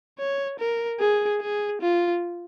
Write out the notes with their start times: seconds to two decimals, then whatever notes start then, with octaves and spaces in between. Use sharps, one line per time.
0.19 C#5
0.59 A#4
1.00 G#4
1.41 G#4
1.81 F4